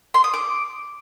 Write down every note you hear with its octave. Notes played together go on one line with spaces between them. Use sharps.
C6
D#6
D6